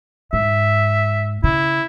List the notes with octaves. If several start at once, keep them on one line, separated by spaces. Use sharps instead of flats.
G#2 E5
C#3 E4